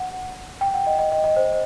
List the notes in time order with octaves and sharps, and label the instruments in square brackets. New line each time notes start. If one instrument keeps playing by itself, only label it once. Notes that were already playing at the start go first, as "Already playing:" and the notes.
Already playing: [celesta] F#5
G5
F#5
D#5
D#5
D#5
D#5
C5